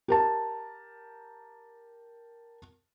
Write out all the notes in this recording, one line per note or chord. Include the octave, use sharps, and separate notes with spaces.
G4 A#4 A5